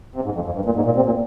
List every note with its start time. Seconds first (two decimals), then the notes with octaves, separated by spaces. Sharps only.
0.16 C3
0.25 G#2
0.35 F2
0.45 F2
0.56 G2
0.65 A#2
0.76 G#2
0.85 A#2
0.96 C3
1.06 A#2